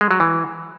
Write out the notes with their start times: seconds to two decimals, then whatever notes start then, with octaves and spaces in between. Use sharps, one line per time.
0.01 G#3
0.11 F#3
0.20 E3